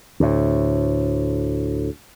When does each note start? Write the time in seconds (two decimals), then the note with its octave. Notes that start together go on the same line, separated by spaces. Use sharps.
0.20 D2 A2